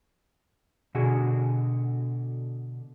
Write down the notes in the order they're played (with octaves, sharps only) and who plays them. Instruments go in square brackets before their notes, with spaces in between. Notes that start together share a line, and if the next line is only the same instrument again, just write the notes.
[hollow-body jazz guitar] B2 D3 F#4 G#4